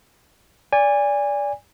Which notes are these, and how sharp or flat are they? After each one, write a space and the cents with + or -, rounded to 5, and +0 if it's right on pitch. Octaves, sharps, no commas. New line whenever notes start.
D5 -20 G#5 -25